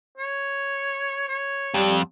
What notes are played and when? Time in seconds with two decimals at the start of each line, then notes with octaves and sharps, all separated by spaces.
0.17 C#5
1.28 C#5
1.74 F2 G3